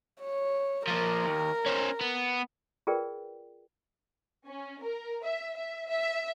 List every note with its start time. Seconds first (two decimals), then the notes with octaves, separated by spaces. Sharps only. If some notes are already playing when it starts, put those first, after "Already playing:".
0.21 C#5
0.88 F3 A#3 A#4
1.26 D#2
1.66 C#4 C5
2.01 B3
2.87 F4 G#4 A#4 B4 D5 G5
4.47 C#4
4.81 A#4
5.24 E5
5.57 E5
5.88 E5